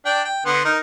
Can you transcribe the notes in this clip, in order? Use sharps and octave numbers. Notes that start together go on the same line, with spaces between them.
D4 G5
G5
D3 B3 C6
D#4 A#4